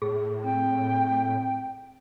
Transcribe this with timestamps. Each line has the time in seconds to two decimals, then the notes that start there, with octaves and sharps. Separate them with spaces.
0.02 A2 G#4
0.44 C4 G5